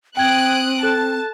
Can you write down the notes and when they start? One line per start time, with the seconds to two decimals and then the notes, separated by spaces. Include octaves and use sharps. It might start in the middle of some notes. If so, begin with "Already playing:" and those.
0.17 C4 G5 D#6 F#6 G#6 D7
0.83 A4 A5 F#6